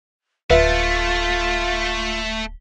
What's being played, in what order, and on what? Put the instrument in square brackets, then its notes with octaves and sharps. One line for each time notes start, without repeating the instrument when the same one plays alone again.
[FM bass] D1 [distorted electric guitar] A3 [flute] F4 [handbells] B4 E5 F5